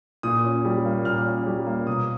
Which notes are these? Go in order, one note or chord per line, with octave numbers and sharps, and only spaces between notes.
A#2 D#6
C#4
G3
A#3
A#2 F6
C#4
G3
A#3
B2 D#6